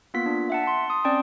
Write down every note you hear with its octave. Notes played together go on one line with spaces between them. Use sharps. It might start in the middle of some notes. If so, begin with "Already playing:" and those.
A#3 B3 F4 B6
D4
E5 F#5 A5
A5 C6
C6 D#6
C4 C#4 D5 G5 A5